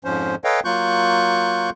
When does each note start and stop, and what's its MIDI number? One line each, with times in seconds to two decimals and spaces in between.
0.05 0.35 41
0.05 0.35 44
0.05 0.35 53
0.05 0.35 61
0.05 0.35 72
0.44 0.60 69
0.44 0.60 71
0.44 0.60 73
0.44 0.60 75
0.44 0.60 77
0.44 0.60 79
0.65 1.70 54
0.65 1.70 58
0.65 1.70 65
0.65 1.70 85
0.65 1.70 90
0.65 1.70 91